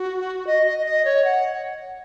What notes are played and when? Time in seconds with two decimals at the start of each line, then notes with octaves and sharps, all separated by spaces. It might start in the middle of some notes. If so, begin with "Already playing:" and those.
Already playing: F#4
0.47 D#5
0.67 D#5
0.86 D#5
1.05 C#5
1.25 F#5